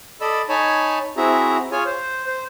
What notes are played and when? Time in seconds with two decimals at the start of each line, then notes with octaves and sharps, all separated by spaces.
0.21 A4 D5 D#5 B5 E6
0.49 D#4 C#5 G#5 A5 B5
1.17 C4 E4 F#4 G#4 E5 A#5
1.71 F4 G#4 C#5 G#5
1.86 C5
2.27 C5